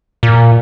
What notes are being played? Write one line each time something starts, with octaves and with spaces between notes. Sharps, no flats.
A#2